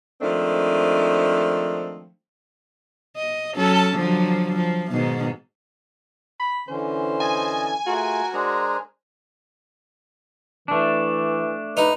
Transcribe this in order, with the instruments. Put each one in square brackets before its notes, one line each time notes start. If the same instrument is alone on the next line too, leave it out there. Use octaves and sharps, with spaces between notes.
[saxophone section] D#3 F3 G#3 A3 C4 D4
[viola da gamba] D#5
F#3 C#4 A4
D3 F3 F#3
F3
G#2 B2 D#3
[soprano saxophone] B5
[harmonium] D3 E3 C#4 [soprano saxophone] C5
[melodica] D#5 A5 [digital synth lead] G#5
[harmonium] A3 F4 G#4 [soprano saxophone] F#4 [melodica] A#4
[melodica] G#3 D4 A#5 [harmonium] A#4 C5 G#5
[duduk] E3 [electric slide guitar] A3 D4
[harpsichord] D#4 [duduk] B4